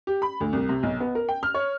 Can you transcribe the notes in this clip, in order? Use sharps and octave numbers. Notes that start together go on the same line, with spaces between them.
G4
B5
D2
C2
C3
B1
B3
A#4
G5
F6
C#5